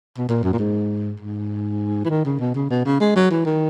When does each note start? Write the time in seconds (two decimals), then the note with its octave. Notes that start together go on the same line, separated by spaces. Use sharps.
0.18 B2
0.29 A#2
0.43 F#2
0.53 A#2
0.59 G#2
1.20 G#2
2.05 E3
2.10 D#3
2.26 C#3
2.40 B2
2.55 C#3
2.70 B2
2.85 C#3
3.00 G#3
3.16 F#3
3.31 E3
3.46 D#3